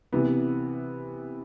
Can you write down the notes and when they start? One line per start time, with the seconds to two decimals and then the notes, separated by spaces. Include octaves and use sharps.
0.13 C3 E3 B3